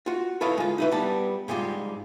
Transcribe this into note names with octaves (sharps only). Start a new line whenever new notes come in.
F4 F#4
E4 A4 B4 C#5 D#5 F5
G#3 F4
D#4 E4 B4
G3 B3 A5
G#2 G3 G#3 F4 G4